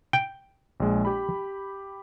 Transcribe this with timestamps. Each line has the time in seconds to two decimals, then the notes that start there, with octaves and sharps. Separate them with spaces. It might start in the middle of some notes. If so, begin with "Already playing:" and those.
0.13 G5
0.80 A#1 G#3
1.05 G4 B5